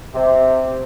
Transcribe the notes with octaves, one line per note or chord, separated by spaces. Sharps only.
C3